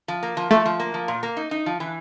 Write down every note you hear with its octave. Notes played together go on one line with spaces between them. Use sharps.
F3
A#3
F3
F3 A3
F3
A#3
F3
A#2
A#3
D#4
D#4
F3
E3